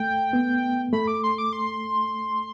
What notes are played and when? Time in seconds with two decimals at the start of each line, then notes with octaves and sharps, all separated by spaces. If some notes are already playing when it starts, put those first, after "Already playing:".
Already playing: A3 G5
0.33 B3
0.93 A3 B5
1.07 D6
1.24 C6
1.38 D6
1.53 C6